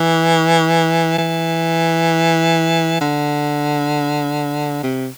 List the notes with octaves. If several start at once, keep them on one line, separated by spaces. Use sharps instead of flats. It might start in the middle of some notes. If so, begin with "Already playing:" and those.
Already playing: E3
E3
D3
C3